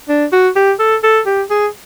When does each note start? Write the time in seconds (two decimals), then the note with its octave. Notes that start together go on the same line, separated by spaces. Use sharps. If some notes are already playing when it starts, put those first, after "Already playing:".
0.08 D4
0.32 F#4
0.56 G4
0.79 A4
1.04 A4
1.26 G4
1.50 G#4